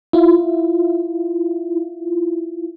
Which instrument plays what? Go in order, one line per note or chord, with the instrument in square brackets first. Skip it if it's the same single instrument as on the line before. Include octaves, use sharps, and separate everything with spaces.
[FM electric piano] E4 F4